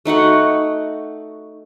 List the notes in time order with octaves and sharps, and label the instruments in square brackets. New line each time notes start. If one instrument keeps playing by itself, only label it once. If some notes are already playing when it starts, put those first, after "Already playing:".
[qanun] A3 D#4 F#4 F#5